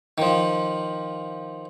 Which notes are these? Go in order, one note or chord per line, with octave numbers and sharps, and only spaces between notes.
D#3 F3